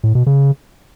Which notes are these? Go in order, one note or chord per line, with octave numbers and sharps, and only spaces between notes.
A2
B2
C#3